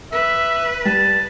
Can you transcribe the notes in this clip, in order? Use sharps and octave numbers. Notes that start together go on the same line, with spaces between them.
B4 E5
G3 A5